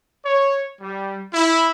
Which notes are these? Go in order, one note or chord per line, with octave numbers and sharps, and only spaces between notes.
C#5
G3
E4